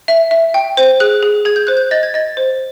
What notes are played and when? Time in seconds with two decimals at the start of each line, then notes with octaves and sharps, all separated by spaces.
0.08 E5
0.31 E5
0.54 G5
0.77 C5
1.00 G#4 F#6
1.22 G#4
1.45 G#4 G#6
1.56 G6
1.67 C5 F#6
1.77 G6
1.91 D#5 A6
2.03 G#6
2.14 D#5 A6
2.37 C5